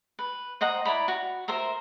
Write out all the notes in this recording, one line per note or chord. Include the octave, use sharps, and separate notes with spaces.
B4
C5 D#5 F#5 A#5
E4 D5 A#5 B5
F#4
A#4 C5 E5 A#5